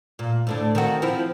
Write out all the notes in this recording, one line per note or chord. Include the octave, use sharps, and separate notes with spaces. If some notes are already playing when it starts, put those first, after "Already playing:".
A#2
D2 A2 D4
D#3 C4 F#4
F3 C4 E4